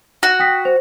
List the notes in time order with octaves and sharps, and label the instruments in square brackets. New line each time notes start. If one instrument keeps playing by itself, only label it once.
[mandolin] F#4
[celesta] G5 D#6 B6
C5